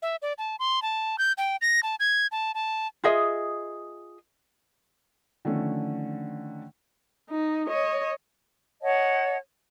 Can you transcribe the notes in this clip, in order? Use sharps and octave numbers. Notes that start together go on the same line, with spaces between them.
E5
D5
A5
C6
A5
G6
G5
A#6
A5
G#6
A5
A5
F4 G#4 D#5 E5
D3 D#3 F3 A3 C#4
D#4
C#5 D#5
C#5 D#5 F#5 A5